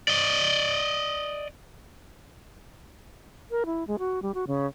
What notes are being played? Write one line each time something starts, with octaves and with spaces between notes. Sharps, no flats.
D5 D#5
A#4
E4
G#3
F#4
G3
F#4
C#3